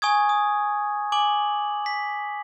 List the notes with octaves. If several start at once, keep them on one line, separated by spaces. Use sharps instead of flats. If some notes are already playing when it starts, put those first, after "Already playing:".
G#5 C#6 D#6 G#6
D#6
G#5 D6 F#7
B6